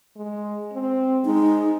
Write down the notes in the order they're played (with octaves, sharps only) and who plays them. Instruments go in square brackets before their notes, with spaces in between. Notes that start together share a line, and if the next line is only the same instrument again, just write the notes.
[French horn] G#3
C4
[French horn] G#3 [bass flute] D#4